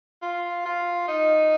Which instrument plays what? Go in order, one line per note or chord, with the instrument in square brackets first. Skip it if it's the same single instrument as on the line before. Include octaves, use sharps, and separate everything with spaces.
[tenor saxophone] F4
F4
D#4